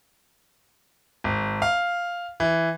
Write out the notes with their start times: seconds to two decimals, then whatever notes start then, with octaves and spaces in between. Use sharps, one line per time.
1.24 G#1
1.62 F5
2.40 E3